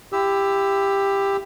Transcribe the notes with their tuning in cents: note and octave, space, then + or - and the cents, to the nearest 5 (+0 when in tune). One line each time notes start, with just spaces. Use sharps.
E4 +30 G4 +15 E6 +0